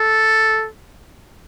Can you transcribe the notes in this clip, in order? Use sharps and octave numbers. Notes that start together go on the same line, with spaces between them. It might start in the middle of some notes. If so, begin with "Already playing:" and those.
Already playing: A4